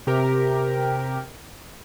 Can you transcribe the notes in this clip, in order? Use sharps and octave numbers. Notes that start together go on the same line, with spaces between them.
C3 G4 A#4